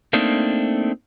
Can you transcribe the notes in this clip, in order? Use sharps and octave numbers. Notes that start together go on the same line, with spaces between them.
A3 A#3 C4 D4 D#4